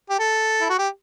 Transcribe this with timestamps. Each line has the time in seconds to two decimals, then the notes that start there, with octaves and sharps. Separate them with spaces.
0.10 G4
0.19 A4
0.61 E4
0.70 F#4
0.79 G4